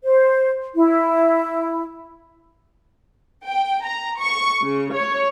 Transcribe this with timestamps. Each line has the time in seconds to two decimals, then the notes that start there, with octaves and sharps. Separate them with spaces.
0.05 C5
0.75 E4
3.45 G5
3.85 A#5
4.18 C#6
4.62 C#3
4.95 C#5